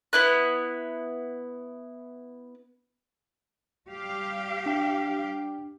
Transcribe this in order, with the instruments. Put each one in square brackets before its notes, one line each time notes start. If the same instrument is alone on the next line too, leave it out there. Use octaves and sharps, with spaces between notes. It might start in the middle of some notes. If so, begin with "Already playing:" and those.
[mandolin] B3 E4 F#6
[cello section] G3 G4 F5
[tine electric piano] D4 G5